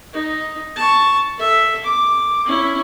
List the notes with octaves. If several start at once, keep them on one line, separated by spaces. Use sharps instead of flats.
D#4
A5 C#6
A4 E5
D6
C#4 E4